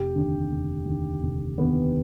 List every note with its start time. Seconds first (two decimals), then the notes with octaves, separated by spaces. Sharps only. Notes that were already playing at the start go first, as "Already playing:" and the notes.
Already playing: F1 G4 G5
0.15 D#2 D3
0.51 F1
0.86 D#2 D3
1.23 F1
1.58 D#2 D3 B3 B4